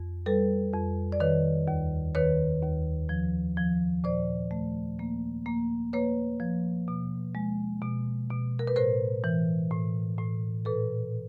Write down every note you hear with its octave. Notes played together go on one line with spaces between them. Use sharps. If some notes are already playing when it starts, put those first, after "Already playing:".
Already playing: F2
G3 A4 B4
F2
D5
D#3 B4 C#5
D#2
D#3 B4 C#5
D#2
F3
F3
A#2 C5 D5
A3
A#3
A#3
A#3 B4 C#5
F3
B2
G#3
B2
B2
A#4
B4
A2 A#4 C5
E3
A2
A2
A#2 A4 B4